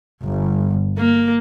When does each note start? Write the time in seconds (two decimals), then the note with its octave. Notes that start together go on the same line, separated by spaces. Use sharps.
0.23 G1
0.99 A#3